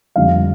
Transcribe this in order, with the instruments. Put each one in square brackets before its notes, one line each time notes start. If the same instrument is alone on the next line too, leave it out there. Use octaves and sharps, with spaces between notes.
[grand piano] F2 D3 G3 F5